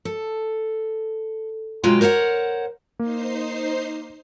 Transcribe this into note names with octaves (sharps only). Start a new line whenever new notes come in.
A4
B2 F#3 G#3 F4 G5
A#4 C5 C#5 F5 F#5
A#3 D#4 C5 C7